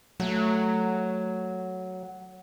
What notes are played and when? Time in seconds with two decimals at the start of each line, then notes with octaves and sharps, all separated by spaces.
0.20 F#3 A3